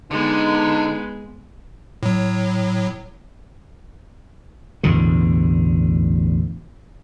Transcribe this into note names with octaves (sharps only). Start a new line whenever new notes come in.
D3 G#3 B3 D#4
A2 F#3
A1 E2 B2 D3